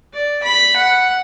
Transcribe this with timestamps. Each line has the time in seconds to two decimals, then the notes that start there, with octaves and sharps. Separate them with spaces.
0.13 D5
0.43 B5
0.76 F#5